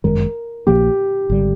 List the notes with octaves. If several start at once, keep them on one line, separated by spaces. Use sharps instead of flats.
G1 F#2 D#3 G#3 A#4
A#1 A#2 F3 A#3 G4
G#1 D3 G3